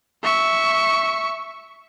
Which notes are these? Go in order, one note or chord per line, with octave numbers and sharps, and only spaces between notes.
E5 C#6